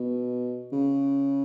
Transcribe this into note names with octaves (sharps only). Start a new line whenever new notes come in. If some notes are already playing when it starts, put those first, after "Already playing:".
Already playing: B2
C#3